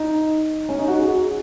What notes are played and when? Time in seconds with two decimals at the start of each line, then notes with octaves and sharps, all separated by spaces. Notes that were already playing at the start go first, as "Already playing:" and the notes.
Already playing: D#4
0.69 C#4
0.79 D#4
0.88 F#4
0.99 G#4